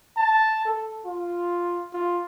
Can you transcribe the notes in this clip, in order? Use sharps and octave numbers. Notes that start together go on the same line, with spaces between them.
A5
A4
F4
F4